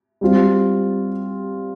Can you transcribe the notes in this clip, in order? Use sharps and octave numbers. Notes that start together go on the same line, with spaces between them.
G3 C4 F4